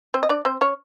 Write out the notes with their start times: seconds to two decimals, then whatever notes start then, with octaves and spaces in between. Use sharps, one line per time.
0.14 C4 C5
0.23 D#5
0.29 D4 D5
0.45 C4 C5
0.61 C#4 C#5